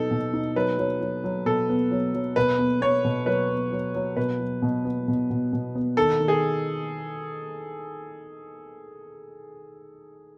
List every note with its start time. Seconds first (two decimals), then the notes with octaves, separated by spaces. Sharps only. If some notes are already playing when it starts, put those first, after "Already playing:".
Already playing: B2 F#3 B3 D#4 A4
0.11 B2
0.33 D#4
0.56 F#3 B4
0.78 F#3
1.01 F#3
1.24 F#3
1.46 B2 A4
1.69 B3
1.91 F#3
2.14 F#3
2.36 B2 B4
2.58 B3
2.81 B3 C#5
3.04 B2
3.26 F#3 B4
3.49 B3
3.72 F#3
3.95 F#3
4.16 B2 B4
4.40 F#3
4.62 B2
4.85 B3
5.08 B2
5.30 B2
5.53 B2
5.75 B3
5.97 D#3 A4
6.20 D#3
6.28 G#4